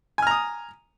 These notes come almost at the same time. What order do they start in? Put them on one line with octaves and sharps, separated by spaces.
G#5 F6 A#5 D#6